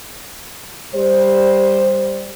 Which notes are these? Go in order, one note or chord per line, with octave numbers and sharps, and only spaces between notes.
G3 C5